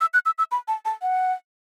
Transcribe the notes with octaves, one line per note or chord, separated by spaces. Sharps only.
E6
F#6
E6
E6
B5
A5
A5
F#5